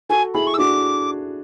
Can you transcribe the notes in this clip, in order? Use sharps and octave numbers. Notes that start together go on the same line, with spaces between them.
F#4 A4 G#5
E4 G#4 B5
C#6
E6
D4 F#4 D6